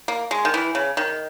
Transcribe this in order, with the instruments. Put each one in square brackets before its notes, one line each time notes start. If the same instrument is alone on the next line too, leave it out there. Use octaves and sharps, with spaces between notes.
[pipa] A#3
G#3
D#3
E3
C#3
D#3